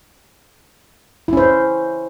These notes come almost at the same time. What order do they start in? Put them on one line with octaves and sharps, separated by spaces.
E4 C#4 C5